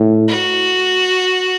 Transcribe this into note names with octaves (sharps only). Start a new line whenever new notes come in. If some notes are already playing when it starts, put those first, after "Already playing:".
Already playing: A2
F#4